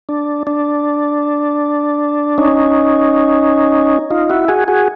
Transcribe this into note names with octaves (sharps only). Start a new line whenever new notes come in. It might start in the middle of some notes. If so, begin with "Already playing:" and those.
D4
D4
C#4 D#4
D#4 F4
E4 F#4
F#4 G#4
F#4 G#4